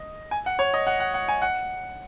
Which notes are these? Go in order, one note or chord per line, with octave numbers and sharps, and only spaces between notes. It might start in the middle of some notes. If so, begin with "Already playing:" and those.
Already playing: D#5
G#5
F#5
C#5
D#5
F#5
F#5
F#5
G#5
F#5